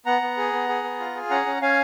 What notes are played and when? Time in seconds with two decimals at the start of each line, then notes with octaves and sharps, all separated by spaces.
0.06 B3 F#5 A#5
0.22 B3
0.37 G#4
0.53 B3
0.69 G#4
0.84 B3
1.00 F4
1.15 G#4
1.30 C#4 F#5 A#5
1.46 C#4
1.62 C#4 F5 G#5